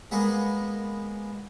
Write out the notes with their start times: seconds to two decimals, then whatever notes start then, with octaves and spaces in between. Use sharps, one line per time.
0.11 G#3 A#3 B3 G#4